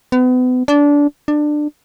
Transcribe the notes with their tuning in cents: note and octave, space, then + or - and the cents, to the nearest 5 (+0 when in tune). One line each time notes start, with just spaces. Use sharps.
B3 +35
D4 -20
D4 +20